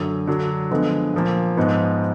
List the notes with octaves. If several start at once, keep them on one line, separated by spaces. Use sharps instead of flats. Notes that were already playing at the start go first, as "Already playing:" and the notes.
Already playing: F#2 D3 F#3
D3 F#3 D4
D3 F3 G#3 B3
A#2 F3 A#3
G#2 F3 B3 D#4